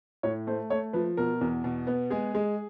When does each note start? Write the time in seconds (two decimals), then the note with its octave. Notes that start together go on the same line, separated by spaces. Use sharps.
0.23 A2 C#5
0.47 A3 C5
0.70 A3 C#5
0.93 F3 B4
1.17 B2 A#4
1.41 E2
1.64 B2
1.87 B3
2.10 G#3 G#4
2.35 G#3